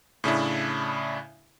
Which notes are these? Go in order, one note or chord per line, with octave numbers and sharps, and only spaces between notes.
A2 C#3 D4 E4